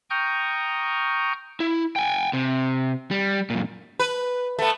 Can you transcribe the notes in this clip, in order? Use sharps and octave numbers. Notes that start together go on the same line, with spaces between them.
G5 A#5 C#6 D#6 F6 G6
E4
G5 G#5
C3
G3
F#2 A#2
B4
A3 B3